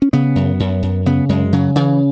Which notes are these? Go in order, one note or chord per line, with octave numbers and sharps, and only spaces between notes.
C#4
C#3 B3
F#2
F#2
F#2
C#3 B3
F#2 G#3
C#3 F#3
C#3 E3